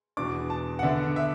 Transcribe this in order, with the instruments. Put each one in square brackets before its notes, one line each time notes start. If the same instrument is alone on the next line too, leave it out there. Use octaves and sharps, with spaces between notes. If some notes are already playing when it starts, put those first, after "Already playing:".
[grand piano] E2 B2 B3 D4 D6
A5
F#5
D3 B3 D4 E5
E5